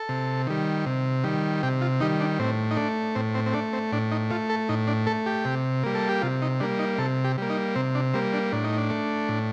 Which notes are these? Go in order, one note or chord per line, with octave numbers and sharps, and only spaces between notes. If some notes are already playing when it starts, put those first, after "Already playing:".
Already playing: A4
C3
D#3 G3
C3
D#3 G3
C3 G4
F4
D#3 G3 D#4
D4
A2 C4
D#4
A3 D4
A2 C4
C4
C4
A3 D4
C4
A2 D4
D#4
A3 F4
A4
A2 D#4
D4
A3 A4
G4
C3
G3 A#3
A4
G4
C3 F4
D#4
G3 A#3 D4
D#4
C3 A4
G4
G3 A#3
D#4
C3 C4
D4
G3 A#3 C4
D4
A2 D4
D#4
D4
A3
A2